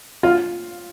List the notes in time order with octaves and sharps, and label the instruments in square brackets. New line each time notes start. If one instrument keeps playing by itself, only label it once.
[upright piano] F4